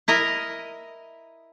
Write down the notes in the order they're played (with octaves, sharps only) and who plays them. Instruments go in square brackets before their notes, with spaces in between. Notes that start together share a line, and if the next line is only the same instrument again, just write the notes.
[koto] E4 A#4 D#5